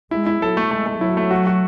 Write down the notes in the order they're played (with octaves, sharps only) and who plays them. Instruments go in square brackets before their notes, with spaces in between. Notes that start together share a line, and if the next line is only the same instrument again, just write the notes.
[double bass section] G#3 [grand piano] E4
[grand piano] E4
[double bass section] F#3 [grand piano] A4
[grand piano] A3
[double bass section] G#3 [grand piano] A3
[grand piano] A3
[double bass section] F#3 [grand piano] E4
[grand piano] A3
F#4
F#4